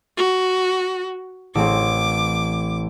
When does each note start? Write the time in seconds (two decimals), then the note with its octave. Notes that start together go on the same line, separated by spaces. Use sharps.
0.17 F#4
1.55 A1 C4 D6